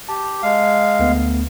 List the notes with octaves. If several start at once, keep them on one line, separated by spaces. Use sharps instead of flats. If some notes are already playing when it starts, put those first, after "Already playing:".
G4 A5
G#3 F5
D2 A3 B3